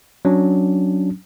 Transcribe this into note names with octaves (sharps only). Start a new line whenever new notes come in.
F#3 C#4 D4